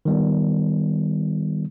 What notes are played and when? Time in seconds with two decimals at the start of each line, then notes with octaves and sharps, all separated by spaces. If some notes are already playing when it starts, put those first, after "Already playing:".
0.05 D#3 G3 B3